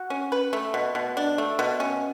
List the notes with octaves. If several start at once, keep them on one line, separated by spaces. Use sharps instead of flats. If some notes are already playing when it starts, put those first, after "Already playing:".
Already playing: F#4
C#4
B4
A3
B2
B2
D4
A3
B2
C#4